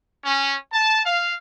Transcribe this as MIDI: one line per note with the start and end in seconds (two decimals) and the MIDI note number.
0.25 0.56 61
0.72 1.01 81
1.05 1.35 77